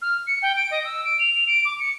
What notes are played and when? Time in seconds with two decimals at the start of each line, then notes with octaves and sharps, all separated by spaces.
0.02 F6
0.27 C#7
0.42 G5
0.56 D7
0.71 D#5
0.84 E6
1.05 D7
1.19 F7
1.47 D7
1.65 D6
1.80 C#7